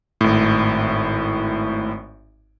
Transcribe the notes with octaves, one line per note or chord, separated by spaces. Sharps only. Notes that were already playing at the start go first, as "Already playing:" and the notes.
G#1 A2